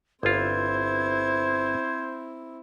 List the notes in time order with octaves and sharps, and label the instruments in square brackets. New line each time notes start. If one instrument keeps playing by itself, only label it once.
[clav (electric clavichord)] G1 F4 [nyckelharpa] C4 E4 [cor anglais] C5 [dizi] G#6